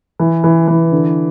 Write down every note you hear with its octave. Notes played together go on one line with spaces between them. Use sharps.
E3
E3
E3
D3